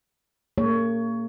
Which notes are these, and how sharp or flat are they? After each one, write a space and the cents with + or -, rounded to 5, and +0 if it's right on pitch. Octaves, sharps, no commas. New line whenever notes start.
A#3 -30 G#4 +0 C#5 +20